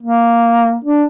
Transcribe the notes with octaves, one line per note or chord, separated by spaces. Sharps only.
A#3
D4